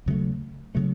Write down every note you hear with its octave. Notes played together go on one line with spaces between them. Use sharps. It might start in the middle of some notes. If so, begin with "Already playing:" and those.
D#2 C#3 F#3 A3
C#3 F#3 A3